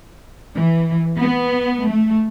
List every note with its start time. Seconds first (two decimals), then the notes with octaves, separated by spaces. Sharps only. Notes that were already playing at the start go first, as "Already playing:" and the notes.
0.58 E3
1.17 B3
1.83 A3